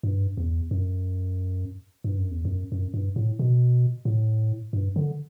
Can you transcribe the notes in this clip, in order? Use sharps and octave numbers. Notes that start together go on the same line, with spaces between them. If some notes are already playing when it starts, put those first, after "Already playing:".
G2
E2
F#2
G2
F#2
E2
F#2
F#2
G2
A2
B2
A2
G2
D3